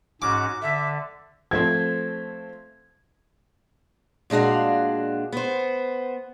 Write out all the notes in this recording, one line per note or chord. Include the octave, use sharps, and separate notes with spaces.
G#2 C#4 F#4 D6
D3 E5
F3 A3 C4 G#6
A#2 G#3 D4 F#4 F5
B3 C5